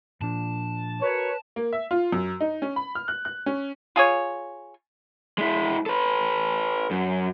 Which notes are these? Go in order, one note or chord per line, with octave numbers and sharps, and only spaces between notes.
A#2 F3 D4 A5
F#4 A#4 B4 C#5
A#3
E5
F4
F#2
D#4
C#4
B5
F6
F#6
F#6
C#4
F4 G#4 C#5
G#3 E4
A4 B4
F#2